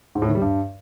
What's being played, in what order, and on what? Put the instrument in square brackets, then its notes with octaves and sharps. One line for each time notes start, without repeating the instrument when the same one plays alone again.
[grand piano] G#2
A2
D#3
G3
G2